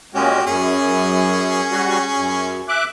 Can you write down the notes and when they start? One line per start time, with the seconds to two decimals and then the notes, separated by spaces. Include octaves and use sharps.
0.14 A#2 G#3 C#4 F#4 G4
0.46 F#2 C#4 G#4
1.71 G3 F#4
2.15 F#2
2.68 E5 D6 F#6